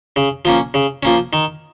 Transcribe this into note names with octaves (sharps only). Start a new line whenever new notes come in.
C#3
F3 A#3 C#4
C#3
F3 A#3 C#4
D#3